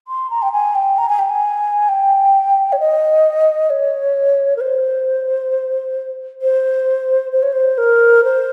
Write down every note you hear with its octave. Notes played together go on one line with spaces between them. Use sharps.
C6
A#5
G5
G#5
G5
A#5
G#5
G5
G#5
G5
C#5
D#5
C#5
A#4
C5
C5
C5
C#5
C5
A#4
C5